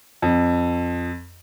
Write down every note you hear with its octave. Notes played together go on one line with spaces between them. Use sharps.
F2